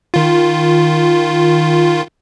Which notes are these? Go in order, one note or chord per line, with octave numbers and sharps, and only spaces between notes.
D#3 F4